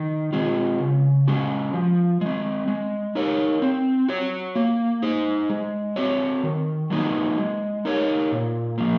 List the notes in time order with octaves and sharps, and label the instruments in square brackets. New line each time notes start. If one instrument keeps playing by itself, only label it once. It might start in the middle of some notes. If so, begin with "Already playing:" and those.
Already playing: [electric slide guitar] D#3
G#3 C4 F4
C#3
G#3 C#4 F#4
F3
G#3 C4
G#3
D#4 A#4 C#5
C4
F#4 C#5
A#3
D#4 G#4 C5
G#3
C4 F#4 C#5
D#3
F#3 A#3 D#4 F#4
G#3
D#4 A#4 C#5
A#2
F3 A#3